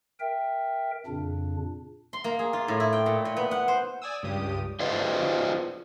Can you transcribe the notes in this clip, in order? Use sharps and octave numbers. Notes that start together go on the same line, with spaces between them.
A#4 E5 G5
F2 A#2 C#3 D4
C6
A#3
G#4
F4
A2
E4
G5
A#2
A#2
B3
F#5
C5
D5 G#5 D#6 E6
C#2 G2 G4 D#6
F4 B4 C5 D5 D#5